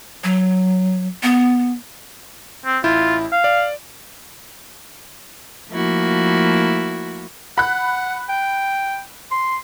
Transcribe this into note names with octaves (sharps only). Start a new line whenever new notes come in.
F#3
B3
C4
A1 E4 F4 G6
F5
D5
F3 A3 A#3 E4 F#4
F#5 B5 F#6
G5
C6